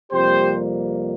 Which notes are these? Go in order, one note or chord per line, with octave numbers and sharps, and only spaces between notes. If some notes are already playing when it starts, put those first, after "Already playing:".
F2 C3 G3 A#3 G4 C5